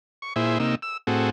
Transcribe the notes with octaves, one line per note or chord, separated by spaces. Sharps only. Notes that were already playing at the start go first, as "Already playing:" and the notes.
C#6
A#2 E4 G#4 C5 E5
C3 A#3 D#4 E6
E6
A2 C4 F#4 G#4 A4